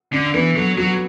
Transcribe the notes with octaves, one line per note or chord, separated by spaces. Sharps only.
D3 D4
E3 B3
F#3 A4
F#3 F#4